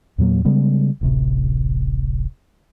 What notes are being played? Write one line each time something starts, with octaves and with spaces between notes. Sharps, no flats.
E2 A#2 F#3 A#3
C#3 G3 G#3 B3
D1 A1 C3